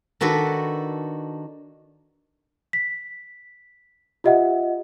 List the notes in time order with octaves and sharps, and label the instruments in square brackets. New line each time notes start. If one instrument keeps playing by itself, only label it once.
[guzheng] D#3 D4 F#4 A4 B4
[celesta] B6
F4 G4 D#5 E5 F#5